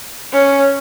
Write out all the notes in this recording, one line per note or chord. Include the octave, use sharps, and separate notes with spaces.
C#4